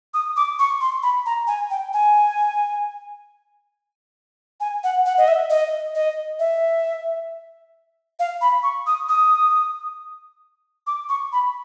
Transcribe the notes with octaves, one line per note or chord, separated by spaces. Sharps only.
D#6
D6
C#6
C6
B5
A#5
G#5
G5
G#5
G#5
F#5
F#5
D#5
E5
D#5
D#5
E5
F5
B5
C#6
D#6
D#6
D6
C#6
B5